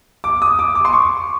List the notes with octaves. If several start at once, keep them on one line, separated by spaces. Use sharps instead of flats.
D6
D#6
D6
D6
C6
C#6